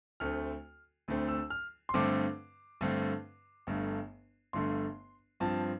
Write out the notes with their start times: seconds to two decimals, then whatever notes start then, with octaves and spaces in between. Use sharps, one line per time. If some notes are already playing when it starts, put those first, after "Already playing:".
0.20 D2 D3 A3 C4 F6
1.08 D2 D3 A3 C4
1.28 E6
1.50 F6
1.89 C6
1.94 G2 D3 A3 C4 D6
2.81 G2 D3 A3 C4
3.67 G1 G2 D3 A3
4.53 G1 G2 D3 A3 C6
5.40 G2 F3 C4 A5